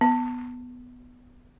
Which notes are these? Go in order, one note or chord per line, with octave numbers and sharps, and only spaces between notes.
B3